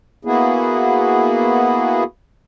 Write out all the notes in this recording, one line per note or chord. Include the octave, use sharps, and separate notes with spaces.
A#3 B3 E4 F#4 G#4